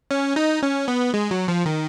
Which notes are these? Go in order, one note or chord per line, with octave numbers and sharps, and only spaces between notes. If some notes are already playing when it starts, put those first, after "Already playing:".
C#4
D#4
C#4
B3
G#3
F#3
F3
D#3